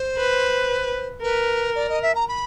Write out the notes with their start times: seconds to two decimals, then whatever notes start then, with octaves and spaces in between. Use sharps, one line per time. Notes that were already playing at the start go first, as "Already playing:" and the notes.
Already playing: C5
0.17 B4
1.23 A#4 B4
1.75 D5
1.89 D#5
2.02 E5
2.15 A#5
2.28 B5